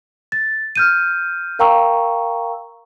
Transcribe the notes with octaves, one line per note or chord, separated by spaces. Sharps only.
A6
F6 G6 D#7
A#4 F5 G5 A#5 C#6 E6